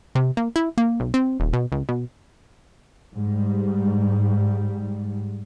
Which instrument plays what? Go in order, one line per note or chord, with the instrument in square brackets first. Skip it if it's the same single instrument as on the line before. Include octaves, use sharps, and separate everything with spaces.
[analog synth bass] C3
A#3
E4
A#3
B1
C4
D#1
B2
C#2
B2
[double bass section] G#2 G3